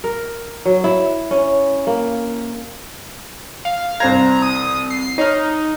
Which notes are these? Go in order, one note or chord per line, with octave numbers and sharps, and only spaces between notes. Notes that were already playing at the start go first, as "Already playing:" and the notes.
A#4
F#3
E4
C#4
A#3
F5
C2 C5 A#5 G#6
D#6
C7
D#4 C#5 F6